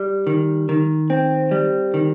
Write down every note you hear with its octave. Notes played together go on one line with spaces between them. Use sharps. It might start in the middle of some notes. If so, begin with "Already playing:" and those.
Already playing: G3
D#3
D#3
C4
G3
D#3